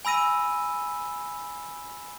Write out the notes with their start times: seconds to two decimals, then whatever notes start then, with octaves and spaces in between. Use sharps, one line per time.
0.05 G#5 B5 E6 A#6 D#7